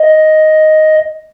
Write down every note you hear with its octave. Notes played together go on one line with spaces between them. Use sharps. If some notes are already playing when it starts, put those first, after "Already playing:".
Already playing: D#5